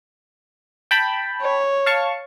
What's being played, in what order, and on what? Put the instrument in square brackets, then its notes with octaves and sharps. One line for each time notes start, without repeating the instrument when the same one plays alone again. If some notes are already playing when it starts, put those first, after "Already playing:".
[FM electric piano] G5 A5 B5
[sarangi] C#5
[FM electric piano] F5 A5 C#6